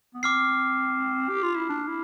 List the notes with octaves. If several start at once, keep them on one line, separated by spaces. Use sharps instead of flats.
B3
C4 D6 F6 C7
G4
F4
E4
D4
E4